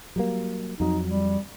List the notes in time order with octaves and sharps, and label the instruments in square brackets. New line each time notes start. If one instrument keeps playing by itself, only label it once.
[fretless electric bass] F#3 G3 A#3
[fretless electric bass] F2 F#3 [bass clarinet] D#4
[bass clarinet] G3